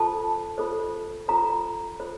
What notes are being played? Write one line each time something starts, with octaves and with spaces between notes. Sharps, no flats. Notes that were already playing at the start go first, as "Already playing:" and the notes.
Already playing: F4 A4 C5 A5
F4 A4 C5
F4 A4 C5 A#5
F4 A4 C5